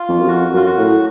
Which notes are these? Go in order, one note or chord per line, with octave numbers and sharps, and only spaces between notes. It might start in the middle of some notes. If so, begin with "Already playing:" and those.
Already playing: F4
F2
F#2
F2 F#4
F#2 F4
F#4
A2